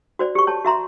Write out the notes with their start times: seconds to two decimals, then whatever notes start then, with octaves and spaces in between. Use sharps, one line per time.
0.19 F#4 C5 D5
0.35 G4 C#6
0.47 C#5 A5
0.65 F#4 E5 A#5 C6